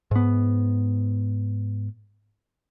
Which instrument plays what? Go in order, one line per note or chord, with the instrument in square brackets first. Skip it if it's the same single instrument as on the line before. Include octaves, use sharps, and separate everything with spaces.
[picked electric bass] G#2 B3